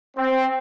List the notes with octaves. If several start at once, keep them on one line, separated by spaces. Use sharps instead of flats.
C4